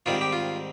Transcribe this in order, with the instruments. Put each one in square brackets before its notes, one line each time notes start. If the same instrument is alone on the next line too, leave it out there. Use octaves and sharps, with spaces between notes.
[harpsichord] G#2 D#3 G3 C4 F4
G4
F4